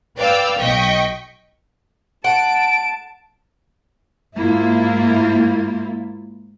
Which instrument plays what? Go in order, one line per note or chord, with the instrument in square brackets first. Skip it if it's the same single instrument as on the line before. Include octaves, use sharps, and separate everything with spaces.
[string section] B4 D5 F5 G5 D6 E6
B1 D#5 G5 C#6 B6
[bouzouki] F#5 [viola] A5 [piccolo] D7
[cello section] G#2 A#3 E4 F4